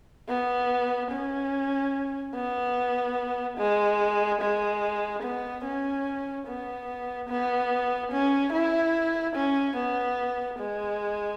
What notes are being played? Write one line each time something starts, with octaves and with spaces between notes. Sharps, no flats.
B3
C#4
B3
G#3
G#3
B3
C#4
B3
B3
C#4
E4
C#4
B3
G#3